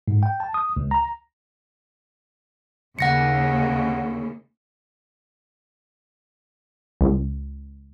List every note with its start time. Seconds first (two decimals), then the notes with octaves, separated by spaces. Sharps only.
0.08 G#2
0.23 G5
0.40 A5
0.54 D#6
0.77 C#2
0.91 A#5
2.99 D#2 C#3 F#5 A#6 C#7
7.01 C#2